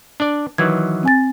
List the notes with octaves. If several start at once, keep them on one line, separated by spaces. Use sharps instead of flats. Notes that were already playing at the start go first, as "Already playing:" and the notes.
D4 D5
D#3 E3 F#3 G#6
C4 G#5 A6